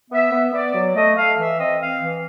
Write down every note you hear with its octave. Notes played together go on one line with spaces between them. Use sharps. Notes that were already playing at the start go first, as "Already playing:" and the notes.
B3 E5
B3
B3 D5
F#3
A3 D#5
A3 F5
E3 E5
C4 D#5
C4 F5
E3